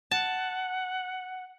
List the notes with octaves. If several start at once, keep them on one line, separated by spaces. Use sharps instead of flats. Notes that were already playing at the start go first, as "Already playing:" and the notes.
F#5 A5